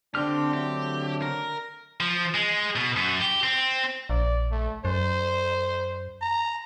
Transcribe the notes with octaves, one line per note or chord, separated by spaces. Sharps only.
D3 C4 D4 G4 F6
F#3 A3 D4 G4
A#4
F3
G#3
B2
F#2
G4
C4
A#1 D5
A3
F#2 C5
A#5